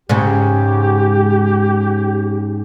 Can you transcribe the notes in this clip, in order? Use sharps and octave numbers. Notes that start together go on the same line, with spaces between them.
G#2 C#3 G4